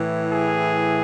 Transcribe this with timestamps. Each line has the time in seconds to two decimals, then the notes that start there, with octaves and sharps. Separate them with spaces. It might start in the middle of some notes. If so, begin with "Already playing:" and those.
Already playing: A2 E3
0.31 G#4